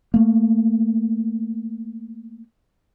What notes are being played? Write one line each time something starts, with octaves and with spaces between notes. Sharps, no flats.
A3 A#3